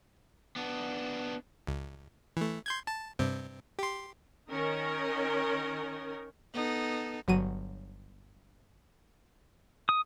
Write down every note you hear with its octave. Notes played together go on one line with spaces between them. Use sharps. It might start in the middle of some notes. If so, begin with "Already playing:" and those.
B3 D4
C#2
E3 A3
C6 G6 G#6
A5
G2 C3 C4
G4 C6
D#3 C#4 A#4
B3 D#4 A4
G1 F#3 D#7
D#6